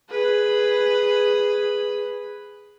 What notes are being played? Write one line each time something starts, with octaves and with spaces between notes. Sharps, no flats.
G#4 B4